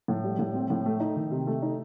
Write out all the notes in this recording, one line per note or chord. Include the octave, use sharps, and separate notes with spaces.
A2
G3
A2
C4
A2
A3
D#4
D#3
C3
A3
D#4